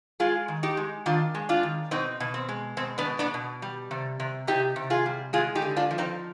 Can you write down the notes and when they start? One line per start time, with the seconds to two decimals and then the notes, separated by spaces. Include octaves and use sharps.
0.20 G#3 F4 G#4
0.48 D#3
0.63 D#4 G4
0.77 G#3
1.06 D#3 D4 F4
1.35 G#3
1.49 D4 F4
1.63 D#3
1.91 B2 C4 D#4
2.20 B2
2.34 C4
2.49 G#3
2.77 B2 C4
2.98 B3 D4
3.05 B2
3.19 B3 D4
3.34 B2
3.62 G3
3.91 C3
4.20 C3
4.47 C3 D#4 G4
4.76 C3
4.90 F4 G#4
5.06 G3
5.33 G#3 F4 G#4
5.55 D#4 G4
5.62 D3
5.77 D4 F4
5.91 F3
5.98 C4 D#4